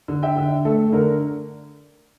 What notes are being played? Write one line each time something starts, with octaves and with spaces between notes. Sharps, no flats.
D3
E5 G5
D3
A3 A4
D3 A#4